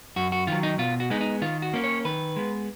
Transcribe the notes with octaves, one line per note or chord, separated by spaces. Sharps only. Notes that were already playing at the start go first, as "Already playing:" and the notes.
F#2 F#4
F#4
D#3 F#3 F4
D#4
B2 F4
F#4
G#3 B3 D#4
D#4
D#3 F4
F#4
A#3 C#4
C#5
D#3 B4
G#3 B3